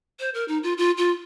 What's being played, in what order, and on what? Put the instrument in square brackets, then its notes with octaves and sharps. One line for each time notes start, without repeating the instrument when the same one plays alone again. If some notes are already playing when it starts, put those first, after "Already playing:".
[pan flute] C5
A#4
D#4
F4
F4
F4